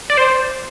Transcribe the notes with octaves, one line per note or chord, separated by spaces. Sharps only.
D5
C5